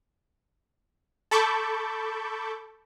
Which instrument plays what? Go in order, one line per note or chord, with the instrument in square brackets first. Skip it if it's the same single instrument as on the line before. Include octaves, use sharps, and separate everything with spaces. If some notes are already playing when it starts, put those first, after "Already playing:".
[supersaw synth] A4 A5 B5 C#6 D6 G6